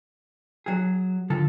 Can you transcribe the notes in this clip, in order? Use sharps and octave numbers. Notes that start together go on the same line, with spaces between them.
F#3 G#4
D3 F3 A4